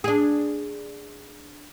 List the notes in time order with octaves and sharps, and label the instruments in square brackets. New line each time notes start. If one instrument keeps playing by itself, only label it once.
[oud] D4 G#4